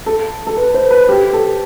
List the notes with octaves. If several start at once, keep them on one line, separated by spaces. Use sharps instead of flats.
A4
A4
B4
C5
B4
G4
A4